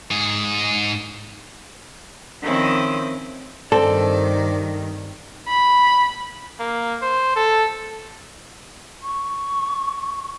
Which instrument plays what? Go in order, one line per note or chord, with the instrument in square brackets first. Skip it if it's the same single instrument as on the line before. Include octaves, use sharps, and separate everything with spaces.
[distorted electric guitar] G#2 G#4
[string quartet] D#3 F3 C4 C#4 E4
[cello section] G2 D#3 [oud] C4 [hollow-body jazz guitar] A4 [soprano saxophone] D5
[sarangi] B5
[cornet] A#3
C5
A4
[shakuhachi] C#6